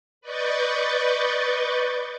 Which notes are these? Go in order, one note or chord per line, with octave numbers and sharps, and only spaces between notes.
B4 D5 D#5 C#6 G6 A6